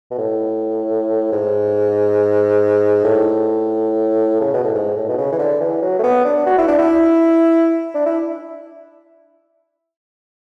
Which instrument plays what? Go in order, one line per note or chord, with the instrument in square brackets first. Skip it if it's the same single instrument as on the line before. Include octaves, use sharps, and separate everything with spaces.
[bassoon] B2
A2
G#2
A2
C#3
B2
A2
G#2
A2
B2
C#3
E3
D3
E3
F#3
A3
B3
D4
F#4
E4
D4
E4
D4
E4